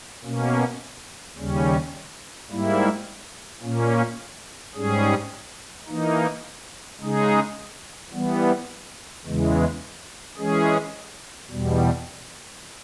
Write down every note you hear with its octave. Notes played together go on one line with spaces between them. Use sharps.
B2 A#3 C#4
D#2 C#3 G3 C#4
G#2 G3 A#3 E4
A#2 A#3 C#4
G#2 G3 C#4 G#4
E3 A#3 D#4
C#3 G#3 D#4 G#4
E3 G3 B3
E2 C#3 E3 G#3
E3 G#3 C#4 G#4
E2 B2 G3